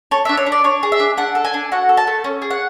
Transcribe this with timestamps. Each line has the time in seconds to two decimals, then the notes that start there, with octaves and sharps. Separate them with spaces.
0.11 A4 C#5
0.25 D4 E5
0.37 C#5
0.47 D4
0.52 D5
0.64 D4 C#5
0.83 G#4
0.92 E5
1.00 D4
1.17 D4 F#5
1.35 A4
1.45 G#5
1.54 D4
1.72 F#4 F#5
1.89 A4
1.97 A5
2.07 A3
2.24 C#4
2.42 G#4
2.51 F#5